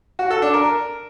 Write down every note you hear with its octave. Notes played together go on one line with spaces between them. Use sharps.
F#4
A4
D4
A#4